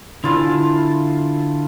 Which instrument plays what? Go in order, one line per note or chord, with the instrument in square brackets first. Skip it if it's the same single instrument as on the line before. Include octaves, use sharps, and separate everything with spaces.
[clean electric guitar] D3 [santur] E4 F4 A5